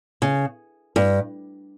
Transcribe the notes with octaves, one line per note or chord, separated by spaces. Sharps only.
C#3
G2